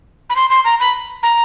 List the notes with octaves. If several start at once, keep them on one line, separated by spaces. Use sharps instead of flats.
B5
C6
C6
A#5
B5
A#5